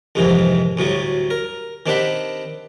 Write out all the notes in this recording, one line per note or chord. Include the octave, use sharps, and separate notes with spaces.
C2 F2 G#2 C3 D#3 E3
D2 A2 F#3 G3
A#4
D#3 C4 D4 G4 F#5 B5